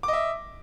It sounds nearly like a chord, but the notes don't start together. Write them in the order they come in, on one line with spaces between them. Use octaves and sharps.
D6 D#5 E5